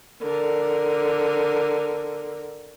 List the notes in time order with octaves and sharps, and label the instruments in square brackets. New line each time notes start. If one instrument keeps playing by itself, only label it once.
[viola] D3 A#4